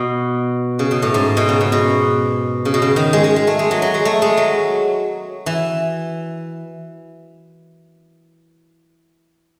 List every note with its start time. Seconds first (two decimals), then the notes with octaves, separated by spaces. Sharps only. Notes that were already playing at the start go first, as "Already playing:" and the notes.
Already playing: B2
0.79 C#3
0.91 B2
1.02 A2
1.14 G#2
1.37 B2
1.49 C#3
1.61 B2
1.72 B2
2.65 C#3
2.74 B2
2.82 C#3
2.96 D#3
3.13 G#3
3.24 G#3
3.36 G#3
3.47 A3
3.59 G#3
3.71 F#3
3.82 F#3
3.94 G#3
4.05 A3
4.22 G#3
4.37 F#3
5.46 E3